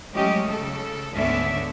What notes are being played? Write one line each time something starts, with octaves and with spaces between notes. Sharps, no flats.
F#3 G#3 A3 C#4 G4 D#5
C#3 A4
D2 G#2 D3 B3 C#4 E5